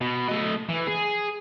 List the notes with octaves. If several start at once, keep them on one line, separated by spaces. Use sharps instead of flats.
B2
A3 D#5
E3
G#4